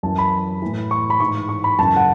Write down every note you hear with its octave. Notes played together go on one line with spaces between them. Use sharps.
F#2 E3 A5
B5
A2 E3
C#6
B5
G#2 E3 C#6
C#6
B5
F#2 C#3 E3 A5
F#5